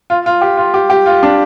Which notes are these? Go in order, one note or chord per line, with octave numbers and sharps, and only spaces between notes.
F4
F4
G4
F4
G4
G4
F4
D4